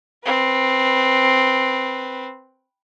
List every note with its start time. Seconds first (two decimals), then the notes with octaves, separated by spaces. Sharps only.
0.24 C4 B4